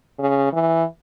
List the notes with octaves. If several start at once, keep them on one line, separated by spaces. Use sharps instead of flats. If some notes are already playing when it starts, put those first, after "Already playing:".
C#3
E3